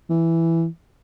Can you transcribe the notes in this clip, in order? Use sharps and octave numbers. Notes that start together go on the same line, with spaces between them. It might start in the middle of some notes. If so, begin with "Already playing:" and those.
E3